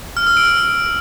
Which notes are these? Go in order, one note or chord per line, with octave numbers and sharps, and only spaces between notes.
F6
E6
D7
F6